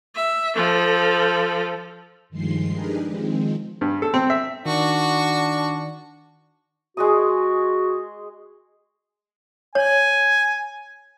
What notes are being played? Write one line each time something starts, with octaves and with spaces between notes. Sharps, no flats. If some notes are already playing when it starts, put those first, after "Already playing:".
E5
F3 A4
G2 D#3 F3 G#3 C6 C7
D4 D#4 G4 G#4 A#4 B4
D#3 F3 G#3 C4
G2
A4
C4
E5
D#3 D4 F#4 C#6
G#3 F#4 G#4 D#6
C#5 G#5